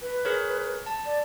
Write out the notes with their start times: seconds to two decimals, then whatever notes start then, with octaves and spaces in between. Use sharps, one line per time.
0.02 B4
0.25 G#4 A#4 C#5
0.86 A5
1.06 D5